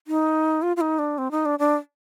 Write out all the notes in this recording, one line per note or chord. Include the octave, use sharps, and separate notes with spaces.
D#4
F4
F4
D#4
D4
C4
D#4
D4
D4